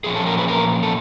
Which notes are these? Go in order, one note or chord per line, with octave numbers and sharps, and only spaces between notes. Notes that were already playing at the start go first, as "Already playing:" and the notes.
A#2 F3 A#3 C#4 G#4
A4
A#4
B4
A#4
A4